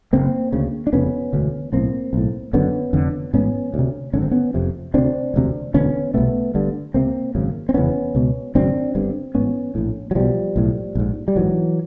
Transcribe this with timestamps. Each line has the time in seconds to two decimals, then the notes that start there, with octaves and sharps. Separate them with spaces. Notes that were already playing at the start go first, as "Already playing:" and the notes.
0.13 F#1 F#2 C#3 A#3 C4
0.53 D2 C#3
0.87 D4
0.93 F1 F2 C#3 B3 C#4
1.33 E1 D2 D3
1.72 B1 A2 A#3 C4
2.13 B1 A2
2.53 F#1 F#2 D3 B3 C#4
2.93 F1 F2 D3
3.34 A1 G#2 B3 C#4
3.74 D2 C3
4.13 G#1 F#2 D3 C#4
4.22 C4
4.31 B3 C#4
4.54 F1 F2 C3
4.94 D2 C3 C4 D4
5.34 E1 D2 C3
5.74 E1 D2 D3 B3 C#4
6.14 C2 B2 A3 B3
6.54 G1 G2 D3
6.94 C#2 C3 A#3 C4
7.35 G#1 F#2 C#3
7.69 C4
7.74 F1 E2 C#3 B3 C#4
8.15 C#2 B2
8.55 G#1 F#2 C#3 C4 D4
8.95 G1 G2 D3
9.35 A1 G#2 B3 C#4
9.75 A#1 A2
10.11 F#3
10.15 B1 B2 F3 G3
10.56 B1 A2
10.95 A#1 G#2
11.28 G3
11.36 A#1 G#2 E3 F#3